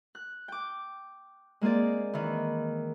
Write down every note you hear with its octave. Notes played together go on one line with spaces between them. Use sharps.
F#6
G5 D6
G#3 A#3 C4 G#4 D5
D#3 E3